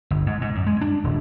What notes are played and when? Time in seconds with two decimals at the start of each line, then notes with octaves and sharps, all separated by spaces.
0.11 G1
0.26 G#2
0.41 G#2
0.55 F#2
0.67 G#3
0.81 D4
1.04 D#1